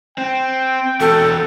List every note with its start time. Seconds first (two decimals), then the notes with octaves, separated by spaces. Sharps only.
0.18 C4 G5
1.01 E2 F#4 A4